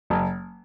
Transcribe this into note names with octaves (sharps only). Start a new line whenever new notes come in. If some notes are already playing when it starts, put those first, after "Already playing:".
F#1